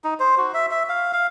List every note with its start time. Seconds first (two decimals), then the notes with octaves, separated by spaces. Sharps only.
0.04 D#4
0.20 C5
0.38 F#4
0.54 E5
0.71 E5
0.89 F5
1.13 F5